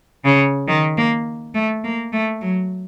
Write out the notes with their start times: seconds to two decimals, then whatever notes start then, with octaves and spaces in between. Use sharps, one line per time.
0.25 C#3
0.68 D#3
0.97 A#3
1.55 A3
1.84 A#3
2.13 A3
2.42 F#3